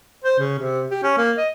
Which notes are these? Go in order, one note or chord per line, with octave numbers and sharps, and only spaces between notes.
C5
C#3
C3
G4
C#4
A#3
D#5